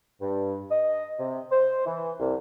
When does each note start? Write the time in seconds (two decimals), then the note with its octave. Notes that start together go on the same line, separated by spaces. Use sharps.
0.21 G2
0.71 D#5
1.19 C3
1.52 C5
1.86 E3
2.20 C2